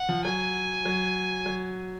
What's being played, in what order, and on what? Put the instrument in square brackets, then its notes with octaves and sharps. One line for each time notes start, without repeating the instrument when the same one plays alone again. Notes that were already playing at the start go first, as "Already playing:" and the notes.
Already playing: [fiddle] F#5
[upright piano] F3
[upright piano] F#3 [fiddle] G#5
[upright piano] F#3
F#3